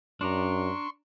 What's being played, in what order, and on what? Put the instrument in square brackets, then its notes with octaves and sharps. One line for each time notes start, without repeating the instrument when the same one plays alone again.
[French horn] F#2 [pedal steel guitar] D4 D5 A#5 [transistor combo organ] C6 C#6